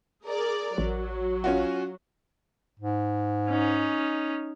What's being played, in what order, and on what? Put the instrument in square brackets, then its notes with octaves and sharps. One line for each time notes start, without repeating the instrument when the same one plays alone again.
[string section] G#4 A#4 D5
[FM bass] A1 [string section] F#3
[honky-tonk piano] C#4 F4 F#4
[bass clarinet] G#2
[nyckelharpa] C#4 D#4